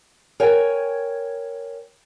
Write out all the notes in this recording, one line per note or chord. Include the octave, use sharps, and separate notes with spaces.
A#4 C#5 G5 G#5